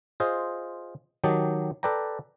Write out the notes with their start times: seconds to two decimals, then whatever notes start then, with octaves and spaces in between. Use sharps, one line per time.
0.20 F4 G#4 C5 D#5
1.24 D#3 F#3 G4 D#5 A5
1.83 A4 B4 D5 G5 A#5